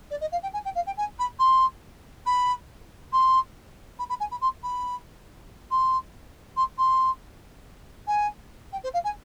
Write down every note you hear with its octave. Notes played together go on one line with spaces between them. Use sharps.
D5
D#5
F5
G5
G#5
G5
F5
G5
G#5
B5
C6
B5
C6
B5
B5
G#5
B5
C6
B5
C6
C6
C6
G#5
G5
C5
F5
G#5